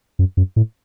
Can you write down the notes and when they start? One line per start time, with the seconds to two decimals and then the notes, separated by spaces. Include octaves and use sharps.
0.19 F#2
0.37 F#2
0.56 A2